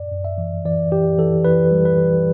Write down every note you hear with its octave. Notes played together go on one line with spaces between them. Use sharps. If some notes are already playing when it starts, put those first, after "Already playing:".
Already playing: F#2 D5
F#2
E5
E3
E3 D5
E3 G4
E3 A4
E3 B4
G3
B4
E3